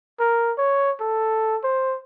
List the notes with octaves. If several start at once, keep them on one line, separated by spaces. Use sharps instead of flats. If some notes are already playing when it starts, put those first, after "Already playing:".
A#4
C#5
A4
C5